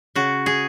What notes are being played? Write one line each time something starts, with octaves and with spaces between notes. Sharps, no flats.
C#3 F#4
G#4